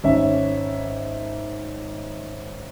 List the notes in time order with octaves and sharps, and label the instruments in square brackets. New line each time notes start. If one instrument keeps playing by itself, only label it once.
[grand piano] G#1 C#4 E5